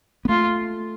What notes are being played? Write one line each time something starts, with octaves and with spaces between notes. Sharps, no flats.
B3
A3 F4